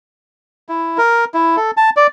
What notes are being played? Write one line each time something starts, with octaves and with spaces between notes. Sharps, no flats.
E4
A#4
E4
A4
A5
D5